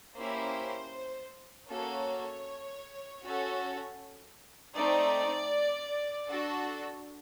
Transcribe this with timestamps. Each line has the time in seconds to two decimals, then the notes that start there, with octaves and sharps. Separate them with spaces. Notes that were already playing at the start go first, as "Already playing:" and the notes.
0.16 A#3 C#4 E4 G4 C5
1.69 A#3 C#4 F#4 A4 C#5
3.23 C#4 F#4 A4
4.76 A3 C4 D#4 D5
6.29 D4 F#4 A4